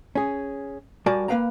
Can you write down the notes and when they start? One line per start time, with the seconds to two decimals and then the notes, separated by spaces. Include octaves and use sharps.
0.15 C#4 G#4
1.06 G3 F#4 A#4 D5 G#5 A5
1.28 A#3 C4 B4 F5 G5 A#5